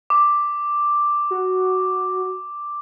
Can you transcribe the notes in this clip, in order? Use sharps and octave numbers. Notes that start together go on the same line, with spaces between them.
D6
F#4